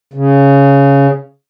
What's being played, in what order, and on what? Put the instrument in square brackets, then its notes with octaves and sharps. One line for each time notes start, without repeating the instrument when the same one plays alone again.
[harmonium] C#3